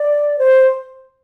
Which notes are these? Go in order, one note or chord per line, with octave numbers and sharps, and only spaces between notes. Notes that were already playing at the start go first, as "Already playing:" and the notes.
Already playing: D5
C5